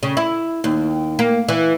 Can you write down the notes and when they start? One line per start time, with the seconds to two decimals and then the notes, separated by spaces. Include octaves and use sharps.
0.03 C#3
0.17 E4
0.64 D#2
1.19 A#3
1.49 E3